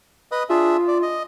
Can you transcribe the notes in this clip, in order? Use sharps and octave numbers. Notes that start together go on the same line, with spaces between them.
B4 D#5 D#6
D4 F4 G#4 E5
D5
D#5